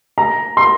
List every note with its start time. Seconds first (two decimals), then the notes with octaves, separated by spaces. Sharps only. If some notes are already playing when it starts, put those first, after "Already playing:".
0.18 A#5
0.57 C6